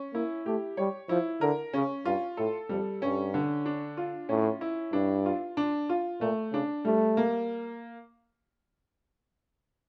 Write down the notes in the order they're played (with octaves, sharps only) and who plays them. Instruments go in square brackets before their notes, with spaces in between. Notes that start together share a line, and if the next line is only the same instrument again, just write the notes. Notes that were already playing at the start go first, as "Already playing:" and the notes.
Already playing: [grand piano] C#4
[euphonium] A#3 [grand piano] E4
[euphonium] A3 [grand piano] G4
[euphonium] G3 [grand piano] C#5
[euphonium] F3 [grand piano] E4
[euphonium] D3 [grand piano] A#4
[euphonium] C#3 [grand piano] C#4
[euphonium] G2 [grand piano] F4
[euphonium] A2 [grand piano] A4
[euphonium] F2 [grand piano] G3
[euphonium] G2 [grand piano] C#4
[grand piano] D3
D4
F4
[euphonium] A2 [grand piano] C#4
[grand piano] E4
[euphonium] G2 [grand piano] D4
[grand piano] F4
D4
F4
[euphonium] A#2 [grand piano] A3
[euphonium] C#3 [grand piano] D4
[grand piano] G3 [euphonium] A3
[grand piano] A#3